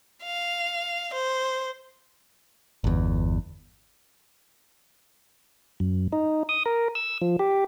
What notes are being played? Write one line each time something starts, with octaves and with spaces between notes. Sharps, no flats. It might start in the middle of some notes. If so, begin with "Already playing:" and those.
F5
C5
G1 E2
F#2
D#4
D#6
A#4
E6
F3
G4